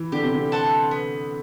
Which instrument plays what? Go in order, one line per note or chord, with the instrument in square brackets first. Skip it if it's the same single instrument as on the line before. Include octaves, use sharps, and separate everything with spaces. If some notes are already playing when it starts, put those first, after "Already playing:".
Already playing: [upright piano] E3
[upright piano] D3 [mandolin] G4
[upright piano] C3
D3
[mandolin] C5 F#5 A5
B3